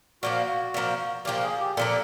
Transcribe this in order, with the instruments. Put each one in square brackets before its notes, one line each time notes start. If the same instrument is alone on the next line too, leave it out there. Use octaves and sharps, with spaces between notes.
[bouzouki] A#2 F3 A#3 [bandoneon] F#4
[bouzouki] A#2 F3 A#3
[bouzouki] A#2 F3 A#3 [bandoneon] G4
[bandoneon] G#4
G4
[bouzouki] A#2 F3 A#3 [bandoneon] A4